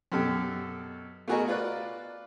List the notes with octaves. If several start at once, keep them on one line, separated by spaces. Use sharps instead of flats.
F#2 B2 G4 A4
A3 B3 F#4 G#4 A#4 D#5
F4 B4 D5 F#6